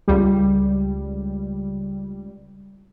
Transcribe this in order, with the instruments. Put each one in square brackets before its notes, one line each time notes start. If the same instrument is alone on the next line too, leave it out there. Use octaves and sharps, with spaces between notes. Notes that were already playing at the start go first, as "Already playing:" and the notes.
[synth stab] C#2 G3